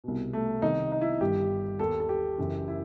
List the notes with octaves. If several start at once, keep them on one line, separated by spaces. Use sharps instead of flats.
C2 B2
A3
C2 C3 D#3 D#4
D#4
E4
G1 G2 D#3 G4
D#2 D#3 A4
A4
G4
F#1 F#2 E3
E4